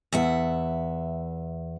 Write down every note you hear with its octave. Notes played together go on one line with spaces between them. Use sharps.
E2 E5 F#5